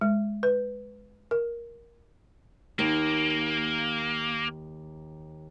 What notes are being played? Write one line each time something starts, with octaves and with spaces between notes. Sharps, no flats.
G#3
B4
A#4
D#2 A#3